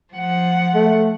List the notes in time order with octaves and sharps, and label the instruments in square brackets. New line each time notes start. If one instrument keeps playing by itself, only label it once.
[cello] F3 F#5
[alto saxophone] A3